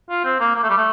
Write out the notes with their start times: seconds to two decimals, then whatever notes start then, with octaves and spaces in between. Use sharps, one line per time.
0.09 F4
0.24 C4
0.40 A#3
0.55 A#3
0.63 A3
0.70 G3
0.78 A3